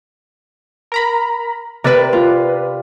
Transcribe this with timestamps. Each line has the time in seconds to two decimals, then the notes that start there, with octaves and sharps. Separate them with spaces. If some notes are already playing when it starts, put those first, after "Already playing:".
0.92 A#4 A#5 B5
1.84 C3 A#4 B4 D5 F#6
2.13 F4